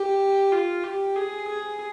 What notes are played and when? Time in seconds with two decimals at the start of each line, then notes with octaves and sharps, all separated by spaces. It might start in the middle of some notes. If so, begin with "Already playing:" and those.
Already playing: G4
0.52 F4
0.84 G4
1.16 G#4
1.48 G#4